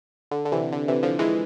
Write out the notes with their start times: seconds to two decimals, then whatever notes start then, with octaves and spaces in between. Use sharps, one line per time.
0.31 D3
0.45 D3
0.52 C3 E3
0.73 D3
0.88 C3 E3
1.03 D3 F3
1.19 E3 G#3